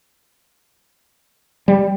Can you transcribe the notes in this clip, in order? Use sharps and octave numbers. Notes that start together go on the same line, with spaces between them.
G3